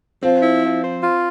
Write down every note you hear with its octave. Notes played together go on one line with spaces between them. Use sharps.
F3 C4
E4
F3
C5
F4